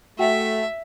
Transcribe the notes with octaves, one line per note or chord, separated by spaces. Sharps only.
A3 F#4 E5 F#5 G5